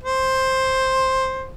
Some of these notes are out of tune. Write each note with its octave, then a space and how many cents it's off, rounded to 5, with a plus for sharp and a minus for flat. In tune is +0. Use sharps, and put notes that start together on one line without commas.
C5 +10